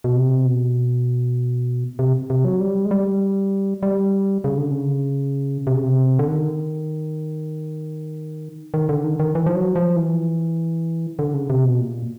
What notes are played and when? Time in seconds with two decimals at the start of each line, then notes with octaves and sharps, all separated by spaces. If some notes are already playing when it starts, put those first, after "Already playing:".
0.04 B2
0.16 C3
0.46 B2
1.99 C3
2.30 C3
2.45 F#3
2.60 G3
2.85 G#3
2.91 G3
3.83 G3
4.44 C#3
4.57 D3
4.71 C#3
5.67 C3
5.75 C#3
5.83 C3
6.19 D3
6.28 D#3
8.74 D#3
8.89 D3
9.04 D#3
9.20 D#3
9.35 E3
9.46 F3
9.55 F#3
9.76 F3
9.96 E3
11.19 D3
11.34 C#3
11.50 C3
11.65 B2
11.80 A#2